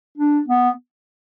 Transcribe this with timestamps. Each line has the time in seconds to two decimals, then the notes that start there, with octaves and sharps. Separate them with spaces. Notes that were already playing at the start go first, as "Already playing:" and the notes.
0.17 D4
0.48 B3